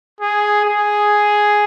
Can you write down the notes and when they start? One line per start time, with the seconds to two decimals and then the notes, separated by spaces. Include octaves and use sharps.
0.21 G#4
0.66 G#4